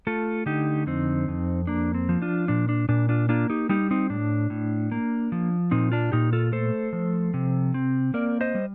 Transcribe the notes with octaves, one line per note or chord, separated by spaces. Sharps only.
A3 F4 A4
D3 D#4 G4
F2 C4 D#4
F2
A#3 D4
C4
F3
D4 F4
A#2 D4
D4
A#2 D4
D4 F4
A#3 D4 F4
D#4 G4
G3 D#4 G4
C4 D#4
A2 D4
A2
A#3
F3
A#2 C4 D#4
D4 F4
A#2 D#4 G4
F4 A4
A3 A4 C5
F3
C3
C4
A#3 A#4 D5
C5 D#5
G3